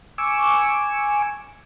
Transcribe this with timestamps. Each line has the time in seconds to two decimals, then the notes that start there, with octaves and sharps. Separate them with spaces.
0.18 G#5 C#6 D6 E6